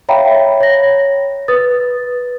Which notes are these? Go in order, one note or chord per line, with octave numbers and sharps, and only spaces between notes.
C#5 E5 F5 G5 A#5 B5
C#5 A#6
B4 D#6 A6